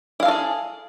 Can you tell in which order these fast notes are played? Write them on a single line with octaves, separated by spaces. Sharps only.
E4 F5 A4 F4 G#4